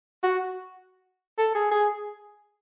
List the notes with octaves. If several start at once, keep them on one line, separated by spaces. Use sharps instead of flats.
F#4
A4
G#4
G#4